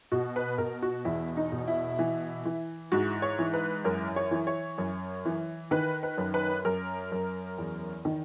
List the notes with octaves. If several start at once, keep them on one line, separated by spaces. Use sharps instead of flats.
B2 F#4
B4
B2 A#4
F#4
E2 E4
D#4
B2
E4
E3
E3
G#2 F#4
C#5
E3
B4
F#2 A#4
C#5
E3
C#5
F#2
E3
D#3 B4
B4
F#2
B4
F#2 A#4
F#2
E2
D#3